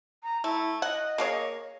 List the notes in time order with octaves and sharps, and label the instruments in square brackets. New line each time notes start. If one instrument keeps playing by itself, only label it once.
[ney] A#5
[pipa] A3 [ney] E4
[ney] D#5 [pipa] F#5
[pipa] A#3 G#4 C#5